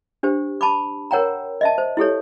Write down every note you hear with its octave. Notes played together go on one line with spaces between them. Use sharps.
D4 G4 C5
A5 B5 D6
A#4 C#5 F#5 G5 A#5
D#5 E5 A5
C5
E4 G4 A4 C#5